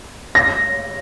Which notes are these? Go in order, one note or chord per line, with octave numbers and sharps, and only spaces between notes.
A#6